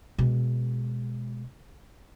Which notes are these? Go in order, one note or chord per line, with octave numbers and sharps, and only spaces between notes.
B2 G#3